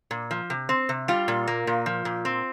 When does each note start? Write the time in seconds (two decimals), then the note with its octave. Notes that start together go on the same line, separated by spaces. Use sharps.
0.11 A#2
0.31 F3
0.50 C3
0.69 C4
0.89 C3
1.08 G3 F4
1.28 A#2
1.47 A#3
1.67 A#2
1.86 F3
2.05 A#2
2.25 C4